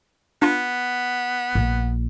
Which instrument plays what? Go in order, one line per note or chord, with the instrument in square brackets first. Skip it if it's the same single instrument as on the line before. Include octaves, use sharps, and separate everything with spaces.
[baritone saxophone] B3 [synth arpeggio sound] D4 F4
[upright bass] A#1